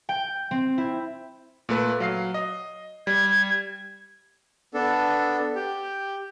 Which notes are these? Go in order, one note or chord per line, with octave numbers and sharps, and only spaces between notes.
G5
C4
E4
A#2 A3 B4
F#3 F5 C7
D#5
G3 G#6
B3 D4 A4
G4